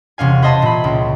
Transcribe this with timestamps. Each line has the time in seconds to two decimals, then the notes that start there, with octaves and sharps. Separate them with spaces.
0.18 E1 C3 C#4 F5 G#5
0.42 B4 C5 D#5 E5 A5 C6
0.62 A#2 B5
0.84 C#2